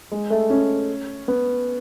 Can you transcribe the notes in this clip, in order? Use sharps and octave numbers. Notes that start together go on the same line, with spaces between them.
G#3
A3
C#4
B3